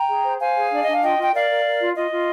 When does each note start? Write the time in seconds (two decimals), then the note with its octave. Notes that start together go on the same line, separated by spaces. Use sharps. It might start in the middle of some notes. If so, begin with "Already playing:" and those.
Already playing: G5 A#5
0.08 G#4
0.24 C5
0.39 C5 F5 G#5
0.56 G#4
0.71 D4 D5
0.83 D4 D#5
0.93 F5
1.02 F4 D#5 G5
1.18 F4 G5
1.33 A#4 D5 F5
1.50 A#4
1.65 A#4
1.80 F4
1.96 F4 D#5
2.11 F4